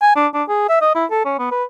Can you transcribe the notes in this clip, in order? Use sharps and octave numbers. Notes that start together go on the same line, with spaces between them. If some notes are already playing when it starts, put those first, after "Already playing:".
G#5
D4
D4
G#4
E5
D#5
E4
A4
C#4
B3
B4